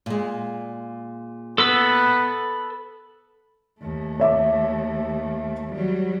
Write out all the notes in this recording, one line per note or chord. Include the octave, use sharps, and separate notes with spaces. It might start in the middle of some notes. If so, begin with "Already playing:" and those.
A#2 G#3
B3 A4 B4 E6
D#2 A3
C#5 E5 D6
F#3 G3